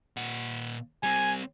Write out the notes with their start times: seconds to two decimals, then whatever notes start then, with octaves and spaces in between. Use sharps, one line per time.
0.17 A#2 F#5
1.03 G3 C4 G#5